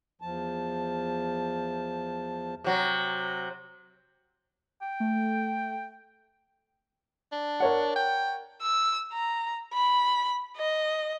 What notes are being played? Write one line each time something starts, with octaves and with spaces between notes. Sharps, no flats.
E2 F3 A5
C3 F#3
G5
A3
D4
A#4 C#5 F#5
G5
E6
A#5
B5
D#5